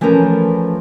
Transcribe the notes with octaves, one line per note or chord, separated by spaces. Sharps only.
E3 F3 A3 C#4 A#4 B4